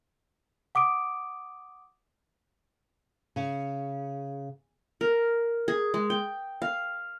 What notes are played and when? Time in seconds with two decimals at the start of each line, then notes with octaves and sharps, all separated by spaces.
0.75 F#5 D6 D#6 D7
3.36 C#3
5.01 A#4
5.68 G#4
5.94 G#3
6.10 G5
6.62 F5